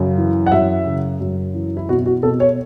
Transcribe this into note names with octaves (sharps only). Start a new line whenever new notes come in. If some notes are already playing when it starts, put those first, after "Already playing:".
Already playing: F#2 C#3
E3
F#5
F#2 E5
C#3
F#2
E3
E4
B2 F#4
F#4
B2 A4
C#5